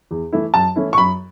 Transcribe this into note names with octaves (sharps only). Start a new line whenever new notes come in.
E2
E3 A3 E4
F#2 A5
E3 A3 C#4 E4
C#6
F#2 B5